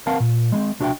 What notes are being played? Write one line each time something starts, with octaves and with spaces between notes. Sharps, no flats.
C4 A#4 F5 F#5 A5
A#2
G#3 A#3 C4
C2 D4 F#4 A4 E5 G5